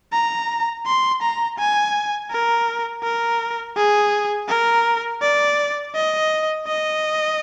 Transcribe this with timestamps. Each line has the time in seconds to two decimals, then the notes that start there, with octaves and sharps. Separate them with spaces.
0.13 A#5
0.86 C6
1.22 A#5
1.58 G#5
2.31 A#4
3.03 A#4
3.76 G#4
4.48 A#4
5.22 D5
5.95 D#5
6.67 D#5